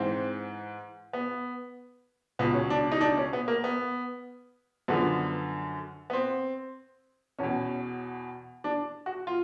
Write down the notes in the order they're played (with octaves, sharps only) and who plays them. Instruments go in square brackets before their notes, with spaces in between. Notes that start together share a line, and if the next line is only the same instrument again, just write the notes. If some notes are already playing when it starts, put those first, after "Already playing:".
Already playing: [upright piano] G#2 E3 C4
B3
C#2 B2 B3
C#4
D4
D#4
D4
C#4
B3
A#3
B3
F#2 D3 F3 B3
B3
C4
E2 B2 C#4
D4
F#4
F4